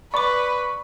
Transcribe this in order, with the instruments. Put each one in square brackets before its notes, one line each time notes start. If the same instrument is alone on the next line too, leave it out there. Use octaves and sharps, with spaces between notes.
[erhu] B4 [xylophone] D5 D6 [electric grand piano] B5 C#6